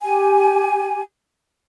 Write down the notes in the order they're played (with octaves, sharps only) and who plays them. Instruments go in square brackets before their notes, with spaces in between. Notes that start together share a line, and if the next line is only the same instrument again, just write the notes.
[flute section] G4 G#5